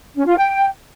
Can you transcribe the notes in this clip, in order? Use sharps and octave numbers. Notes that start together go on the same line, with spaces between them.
C#4
F4
G5